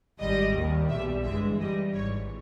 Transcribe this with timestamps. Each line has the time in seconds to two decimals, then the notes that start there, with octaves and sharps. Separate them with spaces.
0.19 G#1 G#2 G3 D#5
0.54 D#2 D#3 G3
0.89 B1 B2 G3 E5
1.24 G1 G2 E3 G#3 E5
1.59 G2 G3 D#5
1.94 G#1 G#2 E3 C#5